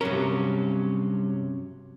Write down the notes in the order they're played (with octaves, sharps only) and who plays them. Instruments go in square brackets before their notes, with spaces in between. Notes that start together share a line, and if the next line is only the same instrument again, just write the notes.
[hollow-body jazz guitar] G2 A#4 [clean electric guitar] C3 F#3 C#4